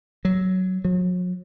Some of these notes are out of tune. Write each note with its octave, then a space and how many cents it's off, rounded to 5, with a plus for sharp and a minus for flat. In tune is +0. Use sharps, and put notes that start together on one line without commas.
F#3 +10
F#3 -40